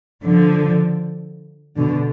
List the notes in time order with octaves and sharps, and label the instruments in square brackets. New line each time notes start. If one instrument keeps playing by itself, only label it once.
[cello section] D3 F3
B2 D3